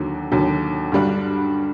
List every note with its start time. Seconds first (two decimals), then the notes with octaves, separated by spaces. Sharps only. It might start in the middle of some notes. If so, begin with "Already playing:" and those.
Already playing: D#2 D3 F#3
0.31 D#2 D3 F#3
0.92 G2 D3 G3 D4 F#4